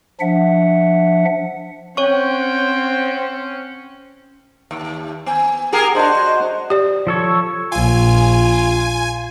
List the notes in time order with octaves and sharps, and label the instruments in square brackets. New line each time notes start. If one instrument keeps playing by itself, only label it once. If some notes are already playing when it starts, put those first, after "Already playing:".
[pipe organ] F3 D4 E5 F#5
[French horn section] C4 [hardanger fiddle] C#4 [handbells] C#5 C#6 [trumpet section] F#5 G5
[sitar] D#2
[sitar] B3 [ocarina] G#5
[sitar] G4 G#4 A#4 [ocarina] F#5
[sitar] D4 F#4 [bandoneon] C5 [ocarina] D#5
[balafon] G4 D5
[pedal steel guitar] F3 A4 C#5
[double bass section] A#1 [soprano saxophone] F4 [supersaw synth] G#5